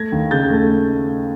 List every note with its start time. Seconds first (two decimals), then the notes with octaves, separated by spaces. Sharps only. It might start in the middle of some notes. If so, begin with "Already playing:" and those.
Already playing: A3 G#6 A#6
0.12 D#2
0.31 C#3 G6 A6
0.50 A3